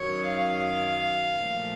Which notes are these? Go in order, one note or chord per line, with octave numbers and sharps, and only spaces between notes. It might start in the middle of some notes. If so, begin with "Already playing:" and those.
Already playing: F#2 D#3 F#3 C#5
F5
A#2 F3 A3